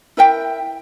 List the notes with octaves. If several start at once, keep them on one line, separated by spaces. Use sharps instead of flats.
E4 A#4 E5 G5